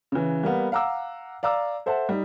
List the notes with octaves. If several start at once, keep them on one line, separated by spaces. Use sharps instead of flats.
C#3 E3
G3 A#3 B3
F5 F#5 A#5 D6 E6
D5 F5 A#5 D6 E6
A4 C5 E5 F#5 A5
G3 D#4